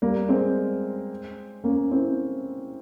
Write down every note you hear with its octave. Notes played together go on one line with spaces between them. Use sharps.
G3 A#3
G#3 C4
A#3 C#4
C4 E4